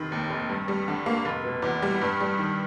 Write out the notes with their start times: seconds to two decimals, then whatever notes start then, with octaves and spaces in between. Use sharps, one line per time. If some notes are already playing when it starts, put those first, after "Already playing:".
Already playing: F1 D#3
0.12 D#2
0.30 F1
0.49 G2
0.68 G3
0.88 D3
1.06 A#3
1.25 F1
1.44 B2
1.62 E2
1.82 G3
2.01 G2
2.20 G3
2.39 D#3